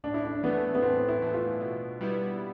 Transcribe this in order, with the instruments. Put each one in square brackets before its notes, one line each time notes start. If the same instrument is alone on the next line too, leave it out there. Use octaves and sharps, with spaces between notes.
[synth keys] A2 [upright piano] D4
[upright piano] E4
D4
[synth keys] E3 A3 [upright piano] B3
[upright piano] B3
[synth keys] A2 [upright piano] C4
[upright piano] E4
[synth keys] E3 A3
[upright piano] F4
[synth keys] B2
G3 B3 E4